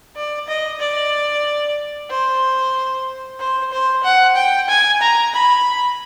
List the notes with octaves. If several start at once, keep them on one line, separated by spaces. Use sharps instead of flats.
D5
D#5
D5
C5
C5
C5
F#5
G5
G#5
A#5
B5